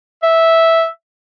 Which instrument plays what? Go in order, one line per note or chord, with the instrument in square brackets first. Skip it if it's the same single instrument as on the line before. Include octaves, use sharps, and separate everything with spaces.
[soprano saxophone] E5